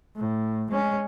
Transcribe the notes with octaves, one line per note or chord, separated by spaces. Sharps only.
A2
G#3 C#4